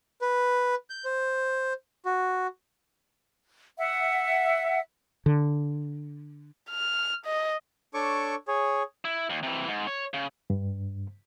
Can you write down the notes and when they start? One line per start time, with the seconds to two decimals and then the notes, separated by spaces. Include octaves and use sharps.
0.22 B4
0.90 G6
1.05 C5
2.05 F#4
3.78 E5 F#5
5.26 D3
6.70 F6
7.26 D#5
7.94 D4 A4 C#5 C#6 D6
8.48 G#4 C#5
9.05 E4
9.30 D#2
9.43 C3 E3
9.68 G#2
9.87 C#5
10.14 C#3
10.50 G2